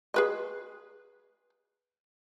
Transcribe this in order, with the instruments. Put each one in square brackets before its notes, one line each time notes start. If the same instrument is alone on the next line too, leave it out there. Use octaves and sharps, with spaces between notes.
[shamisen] G#4 B4 D#5